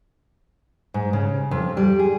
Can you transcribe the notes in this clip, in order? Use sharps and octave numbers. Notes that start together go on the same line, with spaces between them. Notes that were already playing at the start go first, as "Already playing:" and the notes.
G#2
C#3
F2
G3
G#4